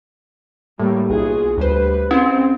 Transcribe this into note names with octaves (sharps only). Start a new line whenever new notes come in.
A2 G3 A#3
B1 F4 F#4 G#4
D2 G3 B4 C5
C4 C#4 E4 G#4 C5